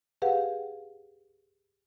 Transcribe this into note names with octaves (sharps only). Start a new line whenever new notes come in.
G4 G#4 B4 F5 F#5